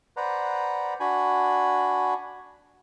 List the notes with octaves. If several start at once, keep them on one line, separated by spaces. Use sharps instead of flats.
B4 C5 D5 F#5 A#5
D4 F#4 G#5 B5